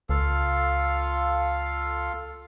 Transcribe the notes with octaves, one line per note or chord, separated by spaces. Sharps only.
C#2 F4 A4 F5